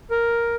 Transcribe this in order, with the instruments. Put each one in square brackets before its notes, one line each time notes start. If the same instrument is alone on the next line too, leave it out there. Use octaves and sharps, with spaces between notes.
[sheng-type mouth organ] A#4